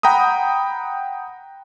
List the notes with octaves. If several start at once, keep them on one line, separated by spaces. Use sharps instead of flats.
F#5 G5 A#5 B5 D#6